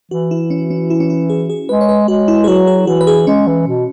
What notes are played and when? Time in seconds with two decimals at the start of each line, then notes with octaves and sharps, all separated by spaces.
0.11 E3 F#4
0.31 E4
0.50 C#4
0.71 C#4
0.90 E4
1.00 C#4
1.10 E4
1.30 G#4
1.50 G#4
1.69 G#3 B4
1.81 C#5
1.89 B4
2.08 G#3 F#4
2.28 E4
2.44 G#4
2.48 F#3 F#4
2.67 G#4
2.87 E3 F#4
3.01 B4
3.07 G#4
3.27 G#3 C#4
3.46 E3
3.67 B2